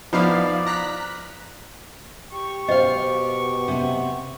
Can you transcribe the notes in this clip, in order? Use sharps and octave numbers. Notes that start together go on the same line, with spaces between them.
F3 B3 D#4 E4 D5 F5
A#5 F#6 B6
G4 C#6
B2 C5 D#5 F5
C3 B3